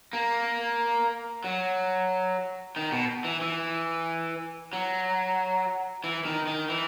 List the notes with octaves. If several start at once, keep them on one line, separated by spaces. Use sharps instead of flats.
A#3
F#3
D#3
B2
E3
E3
F#3
E3
D#3
D#3
E3